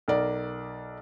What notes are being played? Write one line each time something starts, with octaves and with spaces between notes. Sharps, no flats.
B1 A#4 D5